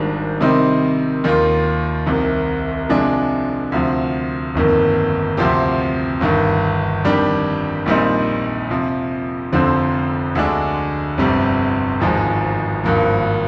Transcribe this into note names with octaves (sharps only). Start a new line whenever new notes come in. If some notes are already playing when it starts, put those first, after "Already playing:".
Already playing: G#1 G#2 D#3 G3 D4
C3 D#3 G3 C4 D#4
D#2 D#3 A#3 F4
C2 C3 D#3
C3 F3 G#3 D4
D2 C3 F3
G1 F2 D#3 A#3
D2 C3 F3 C4 G4
G1 G2 D#3
F2 D#3 G3 D4 G4
A#1 A#2 G3 C4 D#4
F2 C3 F3
F1 F2 D3 F3 C4
D2 D3 G#3 D4
G1 F2 C3 G3
G#1 G#2 F3 G#3
G#1 G2 F3 A#3